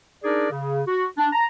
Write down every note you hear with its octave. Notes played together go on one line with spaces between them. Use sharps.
D4 D#4 G#4 A#4 D5
C#3
F#4
D4
A5 A#5